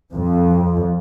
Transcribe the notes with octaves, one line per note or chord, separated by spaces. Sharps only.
F2